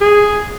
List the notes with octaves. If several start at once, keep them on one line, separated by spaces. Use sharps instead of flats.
G#4